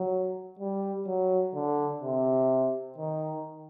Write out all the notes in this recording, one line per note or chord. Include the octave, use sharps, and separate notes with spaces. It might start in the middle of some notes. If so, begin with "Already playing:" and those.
Already playing: F#3
G3
F#3
D3
C3
D#3